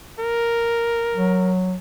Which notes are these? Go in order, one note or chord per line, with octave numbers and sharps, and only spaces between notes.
A#4
F#3